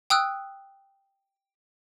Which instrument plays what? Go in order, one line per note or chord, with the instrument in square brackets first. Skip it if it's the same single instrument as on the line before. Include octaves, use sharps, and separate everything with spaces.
[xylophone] G5 D#6 E6 F#6